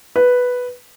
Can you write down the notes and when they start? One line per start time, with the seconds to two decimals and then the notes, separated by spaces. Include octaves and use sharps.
0.16 B4